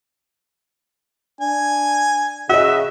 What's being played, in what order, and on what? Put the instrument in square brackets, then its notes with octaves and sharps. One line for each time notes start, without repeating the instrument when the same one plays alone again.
[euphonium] D4 [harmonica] G#5
[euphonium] C#3 [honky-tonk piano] F#4 D#5 [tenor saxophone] E5